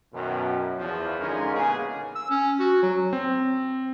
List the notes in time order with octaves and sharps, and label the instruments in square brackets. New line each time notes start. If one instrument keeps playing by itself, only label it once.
[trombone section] F#2 B2 D#3
E2 F3
D3 G#3 C#4 D#4 F4 A#4
A1 C#3 A#3 B3 G#4
[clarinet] E6
C#4
F#4
F#3
[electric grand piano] C4